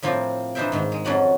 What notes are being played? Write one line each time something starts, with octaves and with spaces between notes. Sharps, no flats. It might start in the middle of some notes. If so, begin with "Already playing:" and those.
A2 F3 A#3 C4 F4
E3 D4 D#4 C5 E5 G5
G#2 D#3
G#3
F2 F#3 C#4 F#4 D5 F#5